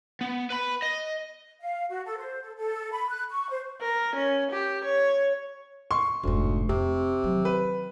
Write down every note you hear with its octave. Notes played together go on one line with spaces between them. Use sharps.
B3
B4 B5
D#5
F5
F#4
A4
C5
A4
A4
B5
F#6
C#6
C5
A#4
C#4
G4
C#5
C6 C#6
F1 D2 G#2
F2 C3 C4
D#3 F#3
B4